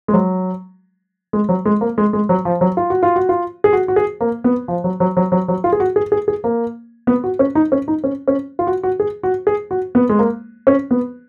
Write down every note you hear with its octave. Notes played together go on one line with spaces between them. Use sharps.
G#3
F#3
G#3
F#3
G#3
A#3
G#3
G#3
F#3
F3
F#3
F4
F#4
F4
F#4
F4
G#4
F#4
F#4
G#4
A#3
B3
F3
F#3
F#3
F#3
F#3
F#3
F4
G#4
F#4
G#4
G#4
G#4
A#3
B3
F#4
C#4
D#4
C#4
D#4
C#4
C#4
F4
F#4
F#4
G#4
F#4
G#4
F#4
B3
G#3
A#3
C#4
B3